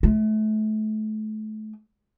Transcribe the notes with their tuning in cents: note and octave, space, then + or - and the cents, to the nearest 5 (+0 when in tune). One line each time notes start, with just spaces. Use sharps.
A3 -30